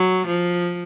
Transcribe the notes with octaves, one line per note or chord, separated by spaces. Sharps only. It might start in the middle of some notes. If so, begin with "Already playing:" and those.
Already playing: F#3
F3